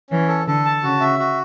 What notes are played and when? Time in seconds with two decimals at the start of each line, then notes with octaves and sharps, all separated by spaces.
0.10 E3 C#4
0.28 A4
0.47 D3 A4
0.65 A5
0.83 C#3 F#4
1.01 E5
1.19 F#4